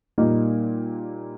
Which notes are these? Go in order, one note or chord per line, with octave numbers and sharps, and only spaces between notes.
A#2 G3 A#3 D#4